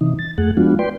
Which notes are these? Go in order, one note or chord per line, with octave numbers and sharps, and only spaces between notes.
C3 E3 D#4
A6
F2 A3 G#4 F#5
F3 G#3 B3 D4 F4 F#4
B4 D5 G5 C6